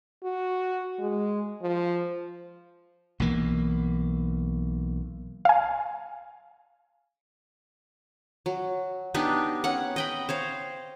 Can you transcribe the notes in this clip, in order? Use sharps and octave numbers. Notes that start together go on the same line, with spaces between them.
F#4
G#3
F3
B1 E3 A#3
F5 G#5
F#3
B3 D4 D#4 G4
C#4 F#5
D#5 G5 B5
C5 C#5 F5